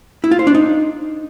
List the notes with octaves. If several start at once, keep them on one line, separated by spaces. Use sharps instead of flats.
E4
F4
C5
D4
D#4